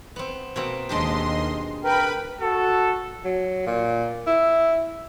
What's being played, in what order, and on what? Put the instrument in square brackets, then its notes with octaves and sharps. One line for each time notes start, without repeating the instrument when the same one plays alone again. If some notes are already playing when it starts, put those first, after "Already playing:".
[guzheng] B3 C4
B2 A#3 C4
[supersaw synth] D#2 D#5 C6 [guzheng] G#3 D4 G4
[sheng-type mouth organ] A#4 [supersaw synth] B4 B5 [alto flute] G5
[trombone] F#4 [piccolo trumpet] A4
[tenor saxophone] F#3
A#2
E4